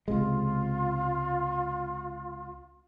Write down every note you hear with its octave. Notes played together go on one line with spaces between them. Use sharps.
C#2 C3 G#3 F4